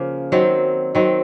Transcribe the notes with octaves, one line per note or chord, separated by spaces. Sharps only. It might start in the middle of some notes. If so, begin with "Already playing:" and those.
Already playing: C#3 F3 A#3
D#3 F#3 C4
D#3 F#3 C4